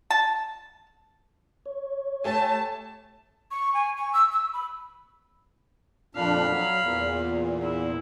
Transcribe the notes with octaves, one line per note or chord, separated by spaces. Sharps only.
A5
C#5
A3 G4 G#5 A5
C#6
G#5
C#6
E6
E6
B5
F2 A#2 D4 F5 B5
F#3
E2 A#2
E4